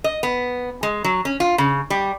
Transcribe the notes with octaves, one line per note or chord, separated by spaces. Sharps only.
D#5
B3
G#3
F#3
C#4
F4
C#3
G3